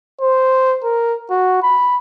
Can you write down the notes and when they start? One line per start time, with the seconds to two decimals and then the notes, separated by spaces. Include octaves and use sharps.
0.21 C5
0.84 A#4
1.30 F#4
1.63 B5